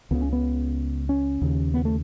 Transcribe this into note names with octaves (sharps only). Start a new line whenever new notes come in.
C#2 C#3 B3
C#4
B3
C#4
D#2 C#3
B3
A3